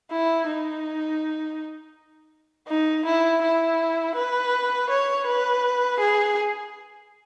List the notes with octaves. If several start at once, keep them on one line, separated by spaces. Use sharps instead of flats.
E4
D#4
D#4
E4
E4
B4
C#5
B4
G#4